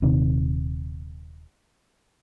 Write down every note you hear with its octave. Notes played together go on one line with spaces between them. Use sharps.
D#1 C3 D#3